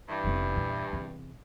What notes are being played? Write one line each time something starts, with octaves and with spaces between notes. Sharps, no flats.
G2 E3
F1 B3
E2 A#2
E2 C3